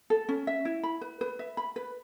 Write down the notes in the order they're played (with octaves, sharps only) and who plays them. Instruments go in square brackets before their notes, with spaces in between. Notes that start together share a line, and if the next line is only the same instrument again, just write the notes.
[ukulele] A4
C#4
E5
E4
B5
B4
B4
E5
B5
B4